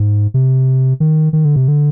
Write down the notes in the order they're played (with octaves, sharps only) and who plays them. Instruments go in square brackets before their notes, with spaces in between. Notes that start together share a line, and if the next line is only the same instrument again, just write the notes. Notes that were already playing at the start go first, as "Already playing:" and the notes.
Already playing: [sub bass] G#2
C3
D#3
D#3
D3
C3
D3